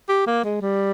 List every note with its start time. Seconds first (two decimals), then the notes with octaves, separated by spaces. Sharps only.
0.09 G4
0.27 A#3
0.44 G#3
0.62 G3